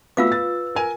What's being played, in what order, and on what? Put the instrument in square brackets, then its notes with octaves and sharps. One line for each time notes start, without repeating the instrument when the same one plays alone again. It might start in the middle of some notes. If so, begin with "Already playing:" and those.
[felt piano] A3 B3 F#4 [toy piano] F4 F5 D6 [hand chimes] B4 E6
[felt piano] A6
A#4 G#5